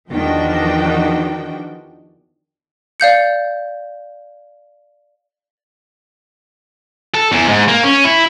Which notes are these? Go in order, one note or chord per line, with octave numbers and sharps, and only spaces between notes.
E2 D#3 F3 D4 F#4 G5
D5 F5 G6 C#7
A4
E2
G#2
A#3
C#4
E4